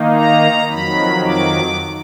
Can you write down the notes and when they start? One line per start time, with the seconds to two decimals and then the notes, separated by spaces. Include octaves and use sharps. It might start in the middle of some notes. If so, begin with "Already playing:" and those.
Already playing: D#3 A#3 D#4
0.14 A#5
0.69 F2 D#3 F#3 B5
1.26 D6